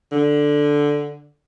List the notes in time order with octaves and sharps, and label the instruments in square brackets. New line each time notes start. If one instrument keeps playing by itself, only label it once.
[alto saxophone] D3